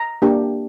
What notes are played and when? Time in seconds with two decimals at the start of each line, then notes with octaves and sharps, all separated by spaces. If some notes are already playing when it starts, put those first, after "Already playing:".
Already playing: A#5
0.22 A#3 D4 G4